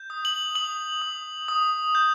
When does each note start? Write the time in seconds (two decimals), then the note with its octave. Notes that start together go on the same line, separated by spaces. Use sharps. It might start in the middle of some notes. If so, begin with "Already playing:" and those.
Already playing: G6
0.10 D#6
0.25 F#7
0.55 D#6 F#7
1.02 D#6
1.48 D#6
1.95 G6